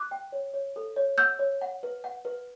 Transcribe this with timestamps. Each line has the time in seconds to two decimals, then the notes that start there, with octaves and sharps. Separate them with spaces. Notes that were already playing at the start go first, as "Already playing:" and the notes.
Already playing: D6 F#6
0.11 G5
0.32 C#5
0.54 C#5
0.76 A4
0.96 C#5
1.18 F#5 E6 G6
1.39 C#5
1.61 F#5
1.83 B4
2.04 F#5
2.25 B4